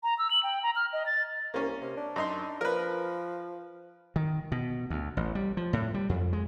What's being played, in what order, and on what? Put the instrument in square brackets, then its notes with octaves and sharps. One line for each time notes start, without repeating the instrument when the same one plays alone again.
[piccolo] A#5
E6
F#7
G5
A#5
F6
D#5
A6
[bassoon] C2 [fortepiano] A#3 C#4
[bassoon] C3
D4
[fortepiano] F#2 D#4 C6
[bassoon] F3 [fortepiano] A#4 B4
[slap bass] D#3
B2
D2
A1
G3
F3
A2
G3
F2
G#3